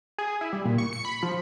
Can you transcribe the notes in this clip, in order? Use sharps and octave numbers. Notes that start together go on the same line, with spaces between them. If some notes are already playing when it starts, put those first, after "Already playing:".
G#4
E4
G3
A#2
C#6
C#7
B5
F3